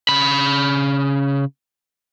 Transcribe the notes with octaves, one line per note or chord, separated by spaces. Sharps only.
C#3 B5